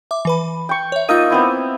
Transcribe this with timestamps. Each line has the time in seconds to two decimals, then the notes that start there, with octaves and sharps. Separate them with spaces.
0.11 E5 D6
0.25 E3 B4 B5
0.69 G5 C#6
0.92 C#5 E5
1.09 A#3 D#4 F4 E6 D#7
1.30 B3 C4 E4